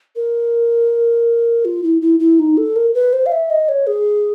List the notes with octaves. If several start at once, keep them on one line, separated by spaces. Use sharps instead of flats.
A#4
F4
E4
E4
E4
D#4
A4
A#4
B4
C5
F5
E5
D#5
C#5
G#4